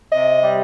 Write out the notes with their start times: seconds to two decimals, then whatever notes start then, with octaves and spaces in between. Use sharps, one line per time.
0.12 C3 D#5
0.43 G3